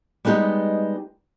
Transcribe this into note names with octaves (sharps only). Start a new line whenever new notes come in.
G3 G#3 B3 D#4 G4